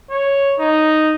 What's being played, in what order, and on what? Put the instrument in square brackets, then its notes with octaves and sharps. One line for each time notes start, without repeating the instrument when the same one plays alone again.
[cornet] C#5
D#4